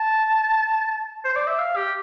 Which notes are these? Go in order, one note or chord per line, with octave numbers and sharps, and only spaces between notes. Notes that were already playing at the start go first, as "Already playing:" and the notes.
Already playing: A5
C5
D5
E5
F5
G4